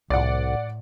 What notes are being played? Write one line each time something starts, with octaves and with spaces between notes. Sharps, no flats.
C2 A2 D5 F#5